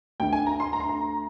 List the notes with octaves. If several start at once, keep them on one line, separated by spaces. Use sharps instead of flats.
D2 D3 G5
G#5
A#5
C6
A#5
C6
A#5